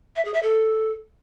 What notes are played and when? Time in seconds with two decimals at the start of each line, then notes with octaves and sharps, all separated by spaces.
0.16 E5
0.25 G#4
0.34 E5
0.43 A4